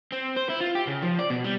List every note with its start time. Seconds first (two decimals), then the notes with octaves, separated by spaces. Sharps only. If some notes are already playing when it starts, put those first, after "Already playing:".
0.12 C4
0.36 C5
0.49 E4
0.61 F4
0.75 G4
0.87 C#3
1.02 F3
1.19 D5
1.30 B2
1.44 G3